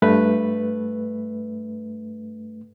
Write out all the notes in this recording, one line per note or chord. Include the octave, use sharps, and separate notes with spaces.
G2 A3 B4